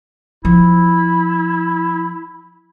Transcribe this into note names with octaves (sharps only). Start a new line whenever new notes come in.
F3 E4